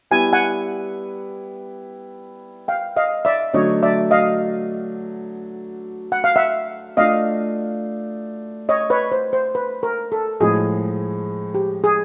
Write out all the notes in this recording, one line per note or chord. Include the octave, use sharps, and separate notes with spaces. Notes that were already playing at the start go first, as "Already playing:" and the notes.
G3 B3 E4 G4 B4 G#5
F#5 G#5
F5 G5
D#5 F5
D5 E5
D3 F#3 A3 D4 C#5 D#5
D5 E5
D#5 F5
F#5
F5
E5 F#5
A3 D4 F4 D#5 F5
C#5 D#5
B4 C#5
C5
C5
B4
A#4
A4
A2 F3 G#3 G#4
G4
G#4